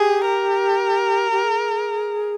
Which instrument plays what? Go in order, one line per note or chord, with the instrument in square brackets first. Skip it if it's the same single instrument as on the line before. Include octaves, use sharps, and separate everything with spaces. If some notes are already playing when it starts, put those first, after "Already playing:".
Already playing: [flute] G4 [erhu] G#4
[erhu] A#4
[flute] G4
G#4